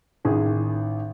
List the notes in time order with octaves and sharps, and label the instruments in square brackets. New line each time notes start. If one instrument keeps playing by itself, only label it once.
[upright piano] A1 D#3 G#4